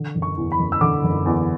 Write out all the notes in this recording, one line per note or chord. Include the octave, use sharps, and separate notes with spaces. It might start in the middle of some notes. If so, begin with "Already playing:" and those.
Already playing: D3
F#1
C#6
E2
B5
F#1
E6
D3 D6
F#1
E2